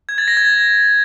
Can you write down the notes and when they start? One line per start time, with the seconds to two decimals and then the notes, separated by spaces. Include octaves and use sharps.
0.09 G#6
0.18 A6
0.28 A#6
0.37 G#6